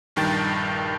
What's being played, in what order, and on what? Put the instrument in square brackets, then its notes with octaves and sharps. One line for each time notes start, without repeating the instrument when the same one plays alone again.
[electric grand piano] A#1 G2 D#3 G5 A5 A6